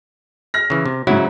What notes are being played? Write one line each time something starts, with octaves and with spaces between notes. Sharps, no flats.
F6 A#6
C#3 E3
C3
G#2 C#3 F#3 E4 F#4